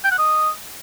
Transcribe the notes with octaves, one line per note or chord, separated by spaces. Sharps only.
G5
F#5
D#5